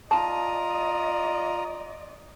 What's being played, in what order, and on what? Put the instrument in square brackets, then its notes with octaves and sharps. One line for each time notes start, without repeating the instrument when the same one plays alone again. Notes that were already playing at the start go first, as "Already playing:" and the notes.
[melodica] F4 A#5 D#6 [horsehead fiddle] D5 D#5 [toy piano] A5